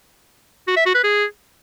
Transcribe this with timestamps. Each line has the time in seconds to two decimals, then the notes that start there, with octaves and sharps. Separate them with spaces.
0.68 F#4
0.77 E5
0.86 F#4
0.95 B4
1.04 G#4